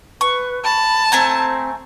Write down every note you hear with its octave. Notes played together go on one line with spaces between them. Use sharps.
B4 C#6
A5 B5
A3 C4 G#5 A#5